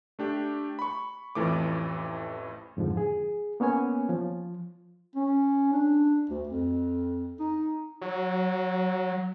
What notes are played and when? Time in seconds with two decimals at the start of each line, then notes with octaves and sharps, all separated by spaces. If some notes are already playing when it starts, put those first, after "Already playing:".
0.19 A3 D4 G4
0.79 B5 C#6
1.35 A1 F2 E3 A3 D6
2.77 F2 G#2 D3 F3
2.97 G#4
3.60 A#3 B3 C#4 C#5 G#5
4.09 F3
5.15 C#4
5.73 D4
6.30 D2
6.47 F2
7.40 D#4
8.01 F#3